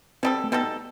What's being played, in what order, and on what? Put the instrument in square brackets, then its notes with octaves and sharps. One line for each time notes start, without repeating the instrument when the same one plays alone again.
[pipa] B2 G3 D#4 A4 [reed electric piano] C4
[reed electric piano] A3
[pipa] B2 G3 D#4 A4 [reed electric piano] B3